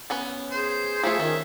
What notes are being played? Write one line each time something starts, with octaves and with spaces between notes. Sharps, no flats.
B3 C#4 B4
G#4 C5
F3 A3 F4 E5
D#3 C#4